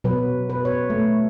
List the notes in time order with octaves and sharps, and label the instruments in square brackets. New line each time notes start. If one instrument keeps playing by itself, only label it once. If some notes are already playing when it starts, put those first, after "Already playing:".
[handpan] B2 F#3 B4
B4
C#5
A3